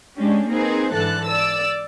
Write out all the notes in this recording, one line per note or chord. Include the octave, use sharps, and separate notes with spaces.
G#3 C#4 D4 G4
A#3 C4 D#4 G#4 B4 C5
G#2 D3 E3 A4 A5 F#6
D5 E6